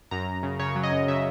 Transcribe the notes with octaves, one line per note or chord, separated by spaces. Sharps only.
F#2 A#5
F#2
C#3
C#3 C#5
F#3
D#5
F#2
C#3 E5